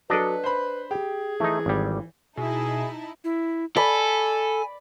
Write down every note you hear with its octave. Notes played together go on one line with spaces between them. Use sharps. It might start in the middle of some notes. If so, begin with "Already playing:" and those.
F#3 D4 A4 B4 D5 D#5
C5 B5
G4 G#4
E3 A3 D#4
G#1 G3
B2 D#4 E4 G#4 A5
E4
A4 D5 G#5 B5